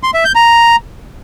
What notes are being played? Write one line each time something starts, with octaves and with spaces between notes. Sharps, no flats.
C6
E5
G6
A#5